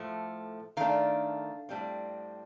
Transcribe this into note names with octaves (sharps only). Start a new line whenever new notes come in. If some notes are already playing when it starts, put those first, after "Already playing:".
Already playing: A2 F3 A3
D#3 A3 D4 F5
A2 G3 C4